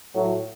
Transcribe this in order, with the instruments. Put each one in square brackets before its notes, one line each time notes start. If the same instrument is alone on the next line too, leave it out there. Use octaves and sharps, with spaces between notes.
[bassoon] A2 [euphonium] F#3